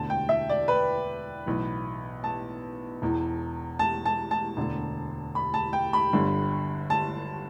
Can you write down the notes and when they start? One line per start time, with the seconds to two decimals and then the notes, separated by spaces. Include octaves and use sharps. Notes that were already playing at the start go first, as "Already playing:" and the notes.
Already playing: E1 D2 D3 A5
0.10 G5
0.29 E5
0.50 D5
0.68 B4
1.46 B1 A2 E3
2.24 A5
3.02 E1 E2 E3
3.79 A5
4.06 A5
4.31 A5
4.57 E1 D2 D3
5.35 B5
5.54 A5
5.73 G5
5.93 B5
6.13 G1 G2 D3
6.90 A5